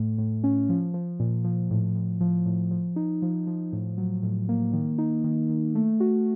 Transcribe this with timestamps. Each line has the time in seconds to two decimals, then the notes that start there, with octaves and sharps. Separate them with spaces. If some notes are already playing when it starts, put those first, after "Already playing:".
Already playing: A2 A3
0.18 A2
0.44 C#4
0.69 F3
0.94 F3
1.20 A#2
1.45 F3
1.71 A2
1.96 A2
2.21 F3
2.46 A2
2.71 F3
2.96 D#4
3.22 F3
3.47 F3
3.73 A2
3.98 F#3
4.23 A2
4.49 A#3
4.73 D#3
4.98 D#4
5.24 D#3
5.49 D#3
5.75 A3
6.00 F#4